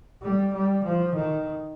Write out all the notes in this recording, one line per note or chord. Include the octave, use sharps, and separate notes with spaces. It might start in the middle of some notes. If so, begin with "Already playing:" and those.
G3
G3
F3
D#3